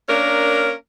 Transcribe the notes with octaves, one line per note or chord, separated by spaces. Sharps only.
A#3 C#4 D4 A#4